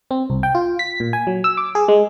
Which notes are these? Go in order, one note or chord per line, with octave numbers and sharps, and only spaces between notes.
C4
C2
G5
F4
B6
A#2
G#5
F#3
E6
D6
G#4
G#3